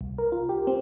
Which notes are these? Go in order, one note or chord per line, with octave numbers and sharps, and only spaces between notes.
C2
A#4
F4
G4
C4